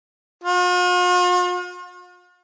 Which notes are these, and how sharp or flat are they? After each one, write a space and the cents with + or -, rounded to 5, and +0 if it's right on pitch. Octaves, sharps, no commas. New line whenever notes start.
F4 +45